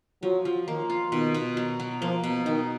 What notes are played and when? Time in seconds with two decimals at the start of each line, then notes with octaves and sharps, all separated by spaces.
0.23 F3 F#3
0.45 F3
0.67 D#3 A#3
0.90 F4
1.12 B2 D#3
1.34 B2
1.57 F#3
1.80 F#3
2.01 F3 A#3
2.24 B2
2.46 D#3 D#4